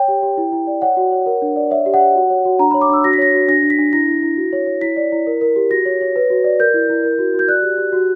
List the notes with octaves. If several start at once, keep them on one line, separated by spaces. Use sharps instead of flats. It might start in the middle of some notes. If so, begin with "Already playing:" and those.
Already playing: C#5 G5
G4
G4
E4
E4
D5
C#5 F#5
F#4
C#5
A#4
D4
D5
C#5 E5
G4
F#5
C#5
F#4
C#5
F#4
D4 A#5
C#5 B5
D6
D4 E6
F#4 A#6
B6
C#5 A#6
F#4
D4 A#6
D4
B6
D4
E4 A#6
E4
E4
F#4
C#5
C#5
E4 B6
D5
E4
A#4
A#4
G4
F#4 A#6
C#5
C#5
B4
F#4
D5
A#4 G6
E4
E4
A#4
F#4
F#4 G6
D5 F#6
G4
G4
F#4